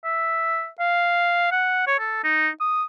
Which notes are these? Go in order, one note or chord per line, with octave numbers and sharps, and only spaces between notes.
E5
F5
F#5
C#5
A4
D#4
D#6